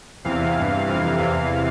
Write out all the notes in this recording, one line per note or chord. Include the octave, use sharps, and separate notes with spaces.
E2 C3 E3 F5
G2 E3
F2 C3 E3 F5
E2 C3 E3